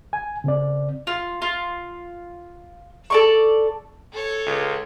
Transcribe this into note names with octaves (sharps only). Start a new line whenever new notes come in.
G#5
C#3 C4 D5
F4
F4
A4 D5 C#6
A4 C#5
C#2